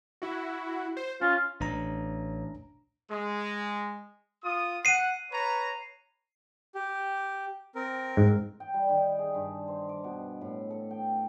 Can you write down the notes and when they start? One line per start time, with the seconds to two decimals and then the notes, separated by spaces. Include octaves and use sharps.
0.22 E4 F#4
0.97 C5
1.21 C#4 F4
1.60 A1 D4 A#5
3.10 G#3
4.43 F4 D#6
4.85 F#5 C7 D#7
5.31 B4 C#5 A#5
6.75 G4
7.75 C4 A#4
8.17 G#2
8.60 G5
8.74 G3
8.89 D#3
9.19 G#4
9.35 G2
9.68 C5
9.89 D6
10.04 B2
10.41 A2
10.70 A4
10.91 G5